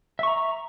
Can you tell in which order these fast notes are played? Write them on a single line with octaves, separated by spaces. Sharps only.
E5 C#6 A#5